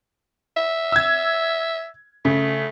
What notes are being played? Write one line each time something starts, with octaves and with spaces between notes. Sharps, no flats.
E5
E6 G#6
C#3 A3